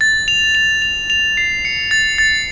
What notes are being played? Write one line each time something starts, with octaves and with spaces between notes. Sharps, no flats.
A6
F7
F7
F7
F7
C7
C#7
A6
A6